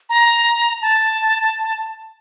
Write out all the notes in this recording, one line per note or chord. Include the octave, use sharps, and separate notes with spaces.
A#5
A5